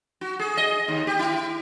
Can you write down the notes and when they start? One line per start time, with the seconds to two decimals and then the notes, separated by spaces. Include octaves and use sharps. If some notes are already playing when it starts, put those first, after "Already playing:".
0.21 F#4
0.39 G#4
0.57 D#5
0.88 D#2
1.07 G4
1.19 E4